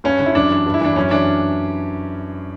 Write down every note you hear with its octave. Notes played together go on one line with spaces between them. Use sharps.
G2 C#4
D3
E4
F#2 D4
E3
G2
E4
E3 D4
F#2 C#4
E3 D4